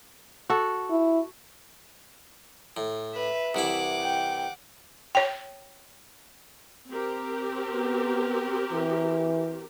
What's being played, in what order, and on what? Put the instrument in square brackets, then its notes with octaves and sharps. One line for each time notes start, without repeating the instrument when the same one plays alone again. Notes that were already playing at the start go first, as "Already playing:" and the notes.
[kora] F#4 A4
[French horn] E4
[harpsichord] A2
[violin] B4 [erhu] E5
[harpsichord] C2 E3 E4 [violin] F#5 D6
[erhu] G5
[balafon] C#5 G5
[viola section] C4 G4 A#4
[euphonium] B3
E3